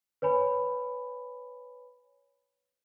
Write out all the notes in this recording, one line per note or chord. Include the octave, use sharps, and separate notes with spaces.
B4 C#5 G#5 B5